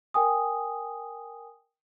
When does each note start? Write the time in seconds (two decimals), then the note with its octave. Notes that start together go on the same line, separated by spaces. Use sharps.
0.14 A#4 G5 G#5 D#6